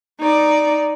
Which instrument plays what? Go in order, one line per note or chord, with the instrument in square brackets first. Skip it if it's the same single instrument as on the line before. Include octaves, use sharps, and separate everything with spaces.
[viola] D#4 D5